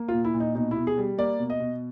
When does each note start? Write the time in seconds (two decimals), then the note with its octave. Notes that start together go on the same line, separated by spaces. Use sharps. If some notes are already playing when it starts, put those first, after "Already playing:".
Already playing: A#3
0.09 A#2 F4
0.25 E4
0.34 A#2
0.40 D#4
0.55 B2 D#4
0.71 E4
0.77 B2
0.87 G#4
0.98 G3
1.18 A#3 D5
1.39 B2
1.50 D#5
1.60 B2